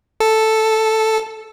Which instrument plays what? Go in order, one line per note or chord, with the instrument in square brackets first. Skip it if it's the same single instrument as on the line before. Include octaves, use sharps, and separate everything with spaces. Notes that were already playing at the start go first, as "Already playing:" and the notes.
[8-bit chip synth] A4